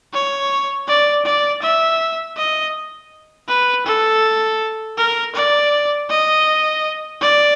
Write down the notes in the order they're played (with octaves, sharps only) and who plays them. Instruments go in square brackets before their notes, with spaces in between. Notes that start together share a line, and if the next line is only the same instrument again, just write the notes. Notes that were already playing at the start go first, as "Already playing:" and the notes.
[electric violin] C#5
D5
D5
E5
D#5
B4
A4
A#4
D5
D#5
D5